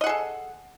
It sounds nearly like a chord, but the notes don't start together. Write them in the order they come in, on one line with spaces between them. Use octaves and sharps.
D#5 F#5 G#4 A4